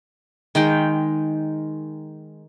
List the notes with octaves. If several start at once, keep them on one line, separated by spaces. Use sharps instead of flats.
D#3 G#3 G5